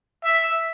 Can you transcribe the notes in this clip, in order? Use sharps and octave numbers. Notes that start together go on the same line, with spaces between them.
E5